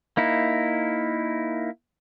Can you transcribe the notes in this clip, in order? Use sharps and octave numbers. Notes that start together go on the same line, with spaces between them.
A#3 D#4 E4